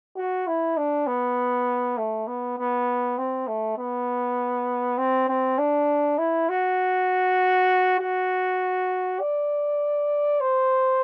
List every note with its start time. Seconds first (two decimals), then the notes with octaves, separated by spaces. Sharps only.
0.17 F#4
0.47 E4
0.77 D4
1.07 B3
1.98 A3
2.27 B3
2.58 B3
3.18 C4
3.48 A3
3.78 B3
4.98 C4
5.29 C4
5.58 D4
6.19 E4
6.49 F#4
8.00 F#4
9.20 D5
10.41 C5